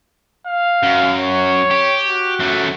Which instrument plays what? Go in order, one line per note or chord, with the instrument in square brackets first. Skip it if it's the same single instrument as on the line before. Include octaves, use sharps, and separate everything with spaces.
[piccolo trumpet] F5
[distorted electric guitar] F#2
[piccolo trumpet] C#5
[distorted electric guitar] G4
[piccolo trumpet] F#4
[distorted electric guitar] F#2 A3